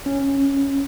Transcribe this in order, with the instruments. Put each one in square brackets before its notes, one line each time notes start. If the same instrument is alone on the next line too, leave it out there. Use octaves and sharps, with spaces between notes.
[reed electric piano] C#4